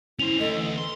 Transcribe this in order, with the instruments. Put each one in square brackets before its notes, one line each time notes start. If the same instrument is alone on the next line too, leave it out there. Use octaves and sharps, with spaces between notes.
[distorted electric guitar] C#4 C5 [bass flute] E4 [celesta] F7
[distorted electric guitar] D2 [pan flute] A4 [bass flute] D#5
[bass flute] E3
[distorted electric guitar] C6